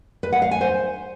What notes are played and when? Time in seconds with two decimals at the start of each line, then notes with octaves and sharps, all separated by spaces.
0.23 B4
0.33 F#5
0.42 F5
0.51 G#5
0.61 C5